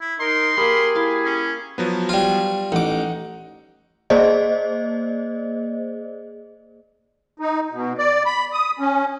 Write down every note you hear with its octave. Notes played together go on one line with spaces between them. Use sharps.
E4
D#4 A#4 C6
A#3 G4 G#4 A#4 B5
E4 F5
C#4
F3 F#3 B3
G3 F4
A1 D#4 F#5 D6
A#3 G#4 C5 D5 D#5
D#4
B2
D5
B5
D#6
C#4